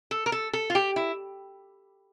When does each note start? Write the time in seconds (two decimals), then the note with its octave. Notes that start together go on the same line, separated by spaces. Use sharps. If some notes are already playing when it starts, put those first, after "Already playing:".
0.11 A4
0.26 A#4
0.32 A4
0.53 A4
0.70 F4
0.75 G4
0.96 E4